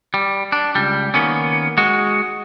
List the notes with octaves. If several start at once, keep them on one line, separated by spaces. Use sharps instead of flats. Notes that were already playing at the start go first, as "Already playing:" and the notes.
G3
D4
C#2 G3
D#3 A#3 B3 C#4
G#3 F#4